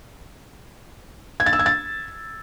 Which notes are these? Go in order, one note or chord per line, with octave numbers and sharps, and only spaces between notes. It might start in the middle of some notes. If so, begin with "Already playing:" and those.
G#6
A6
E6
G#6
A6